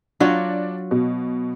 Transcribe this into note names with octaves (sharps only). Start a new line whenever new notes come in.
F#3 D4 F4 F#4
B2